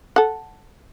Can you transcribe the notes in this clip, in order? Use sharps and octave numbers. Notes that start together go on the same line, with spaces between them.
A4 F#5